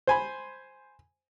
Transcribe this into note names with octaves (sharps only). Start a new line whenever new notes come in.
C5 G#5 B5